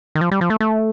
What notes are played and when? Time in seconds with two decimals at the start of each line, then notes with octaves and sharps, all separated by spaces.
0.15 D#3
0.21 F3
0.31 G3
0.41 F3
0.50 A3
0.60 A3